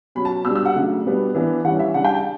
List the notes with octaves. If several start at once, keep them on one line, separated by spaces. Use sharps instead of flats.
B2 F#3 C#4 B5
A5
B2 G3 D4 E6
E6
F#5
C#3 F#3 A3 D4
B2 G3 B3 D4
E3 B3 D4
E3 G3 C#4 F#5
E5
C#3 G3 D4 F#5
G5
A5